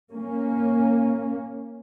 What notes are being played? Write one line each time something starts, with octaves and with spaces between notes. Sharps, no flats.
A#3 C#4